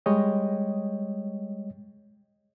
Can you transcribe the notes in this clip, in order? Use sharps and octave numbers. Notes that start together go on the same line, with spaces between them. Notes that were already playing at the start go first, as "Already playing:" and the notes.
G3 G#3 C#5 D#5 G5